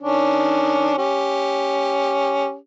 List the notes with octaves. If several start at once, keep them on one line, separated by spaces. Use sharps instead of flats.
D#3 C#4 D4
C#4 G4